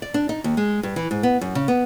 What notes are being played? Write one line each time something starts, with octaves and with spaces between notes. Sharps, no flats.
D5
D4
D#4
D#2
G#3
G2
E3
G#2
B3
F#2
C#3
B3